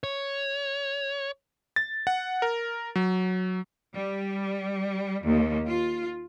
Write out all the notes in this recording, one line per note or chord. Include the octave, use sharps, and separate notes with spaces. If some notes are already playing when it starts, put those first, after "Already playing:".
C#5
A6
F#5
A#4
F#3
G3
D#2
F4